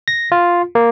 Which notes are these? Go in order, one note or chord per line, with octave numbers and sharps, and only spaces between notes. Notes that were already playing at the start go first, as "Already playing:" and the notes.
A#6
F4
A#3